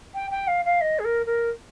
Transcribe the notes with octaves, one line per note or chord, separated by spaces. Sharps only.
G5
G5
F5
F5
D#5
G#4
A#4
A#4